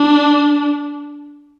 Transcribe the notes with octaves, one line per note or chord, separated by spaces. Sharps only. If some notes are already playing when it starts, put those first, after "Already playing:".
Already playing: D4